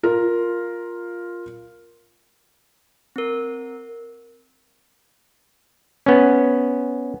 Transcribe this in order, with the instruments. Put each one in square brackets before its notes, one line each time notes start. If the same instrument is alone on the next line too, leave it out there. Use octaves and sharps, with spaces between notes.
[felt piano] F4 A#4
[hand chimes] C4 A#4
[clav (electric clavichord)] B3 C#4